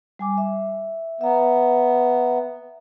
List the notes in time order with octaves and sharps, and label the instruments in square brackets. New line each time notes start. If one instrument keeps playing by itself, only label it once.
[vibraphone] G3 G#5 D6
E5
[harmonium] B3 [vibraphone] E5 A#5